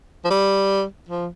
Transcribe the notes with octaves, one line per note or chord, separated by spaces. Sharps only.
F3
G3
F3